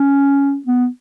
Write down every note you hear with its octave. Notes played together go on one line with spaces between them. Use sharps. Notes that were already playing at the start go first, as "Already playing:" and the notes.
Already playing: C#4
B3